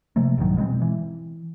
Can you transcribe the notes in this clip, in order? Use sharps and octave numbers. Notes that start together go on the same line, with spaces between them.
C3 F3 A3 A#3
A#1 G2 D#3 F#3
B2 G#3 B3 C4
E3